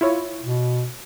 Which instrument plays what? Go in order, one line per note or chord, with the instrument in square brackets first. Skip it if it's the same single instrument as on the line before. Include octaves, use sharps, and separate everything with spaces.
[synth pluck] E4 F4 C#5
[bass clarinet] B2